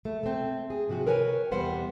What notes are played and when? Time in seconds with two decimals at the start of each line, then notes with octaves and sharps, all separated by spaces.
0.05 A3
0.23 A3 C4
0.70 G#4
0.88 G#2 C3 F3 F#4 G#4
1.07 A#4 B4 C#5 G#5
1.51 E2 C3 G3 B3 C5 F#5